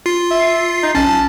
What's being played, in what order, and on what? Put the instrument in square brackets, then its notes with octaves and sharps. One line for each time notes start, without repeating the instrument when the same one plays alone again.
[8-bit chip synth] F4 C7
[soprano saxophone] E5
D#4
[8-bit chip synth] B1 C#4 [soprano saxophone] A5